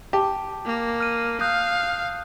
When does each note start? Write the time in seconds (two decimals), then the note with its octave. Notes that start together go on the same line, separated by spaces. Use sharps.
0.13 G4 A5
0.66 A#3
1.00 F6 D#7
1.41 F5 D#6 F#6 G6